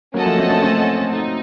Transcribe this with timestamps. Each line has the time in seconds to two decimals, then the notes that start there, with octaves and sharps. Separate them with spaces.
0.13 F#3 A#3 C#4 A4 D#5 F#5 A5
0.26 F3 A3
0.38 A3 C4
0.50 A3 C4
0.62 A3 C4
1.12 D#4